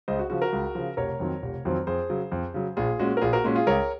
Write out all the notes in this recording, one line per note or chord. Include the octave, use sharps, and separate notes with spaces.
C#2 C5 D#5
F#4
C#3 F3 F#4
F#4 A#4
C#2
C#3 F3
F1 A#4 C#5
F2 D#3 F#3 C4
F1
F2 D#3 F#3 C4
F2 G#4 C5
C#3 F#3
F2
C#3 F#3
A#1 F4 G#4
A#2 G#3 C#4 F#4
A#4
A#1 F4 G#4
F#4 A#4
A#2 G#3 C#4 F#4
F4 G#4
C#2 A#4 C#5